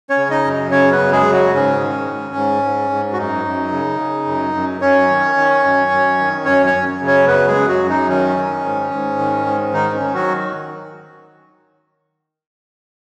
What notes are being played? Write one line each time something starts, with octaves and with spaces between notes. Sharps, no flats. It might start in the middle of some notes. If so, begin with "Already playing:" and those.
C#4 C#5
C#3
D#4 D#5
F#2
C#3 C#4 C#5
B3 B4
F#2
G#3 G#4
C#3
F#3 F#4
G#2 C#4
D#3
G#2
G#2
G#2
G#2
F#4
F#2 D#4
F#2
C#3
C#3
F#2
F#2
F#2 C#4 C#5
D#3
D#3
F#2
F#2
D#3
F#2 C#4 C#5
C#4 C#5
F#2
C#3
C#4 C#5
F#2 B3 B4
G#3 G#4
F#2
F#3 F#4
F#2
D#4
D#3 C#4
D#3
G#2
G#2
D#3
G#2
D#3 D#4
C#4
D#3
F#3 F#4